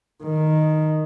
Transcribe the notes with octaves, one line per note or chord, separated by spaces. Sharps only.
D#3